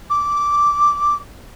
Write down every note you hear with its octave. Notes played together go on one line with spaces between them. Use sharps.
D6